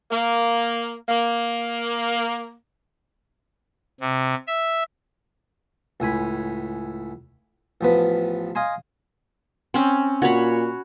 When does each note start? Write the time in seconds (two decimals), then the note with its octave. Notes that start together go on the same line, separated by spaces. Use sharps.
0.11 A#3
1.09 A#3
4.01 C3
4.47 E5
6.00 C#2 A2 G#5 B5
7.81 A1 F3 B3 B4
8.55 D#5 F5 G#5 C6
9.74 C4 C#4
10.22 A#2 F#4 C#5 B5